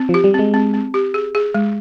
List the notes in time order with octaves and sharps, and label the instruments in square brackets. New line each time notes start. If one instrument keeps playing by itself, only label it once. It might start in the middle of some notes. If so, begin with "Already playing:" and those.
Already playing: [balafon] C4
[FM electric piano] F3
[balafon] G4
[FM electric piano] G3
[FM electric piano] G#3 [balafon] C4
[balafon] C4
C4
G4
G#4
G#4
G#3